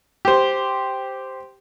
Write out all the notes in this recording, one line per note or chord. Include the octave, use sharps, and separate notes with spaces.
G4 C5